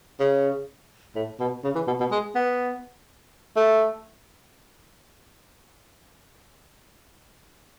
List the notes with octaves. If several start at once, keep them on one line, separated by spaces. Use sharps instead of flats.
C#3
A2
B2
C#3
E3
B2
B2
G#3
B3
A3